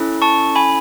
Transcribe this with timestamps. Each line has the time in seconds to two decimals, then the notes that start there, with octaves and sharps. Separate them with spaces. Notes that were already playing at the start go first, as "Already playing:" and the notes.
Already playing: C#4 E4 A4
0.22 A5 C#6
0.56 G#5 B5